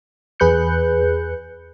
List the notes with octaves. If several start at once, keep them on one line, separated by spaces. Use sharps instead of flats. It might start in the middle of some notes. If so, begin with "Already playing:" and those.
E2 G#4 B4 F#6 G6 C#7